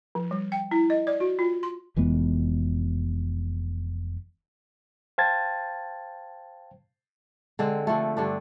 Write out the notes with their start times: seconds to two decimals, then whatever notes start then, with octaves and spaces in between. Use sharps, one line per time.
0.15 F3
0.31 G3
0.52 G5
0.71 E4
0.90 D#5
1.07 D5
1.20 F#4
1.39 F4
1.63 C6
1.96 F1 E3 G#3 B3
5.18 C5 F5 G5 A5 G#6 A6
7.59 D3 G#3 C4
7.87 D3 F3 A3
8.17 G2 D3 C4 D4